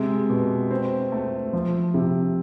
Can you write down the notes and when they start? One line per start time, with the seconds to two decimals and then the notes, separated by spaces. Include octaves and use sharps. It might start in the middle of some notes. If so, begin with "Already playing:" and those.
Already playing: C3 G#3
0.30 B2
0.71 C4
1.12 A3
1.53 F3
1.94 C3